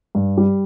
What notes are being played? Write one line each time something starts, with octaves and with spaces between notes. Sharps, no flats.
G2
G3